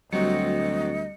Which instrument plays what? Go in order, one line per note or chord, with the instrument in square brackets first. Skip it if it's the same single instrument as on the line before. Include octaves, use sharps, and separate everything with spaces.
[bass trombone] D2 [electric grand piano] F#3 C4 F#4 [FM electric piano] G3 C#7 [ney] D#5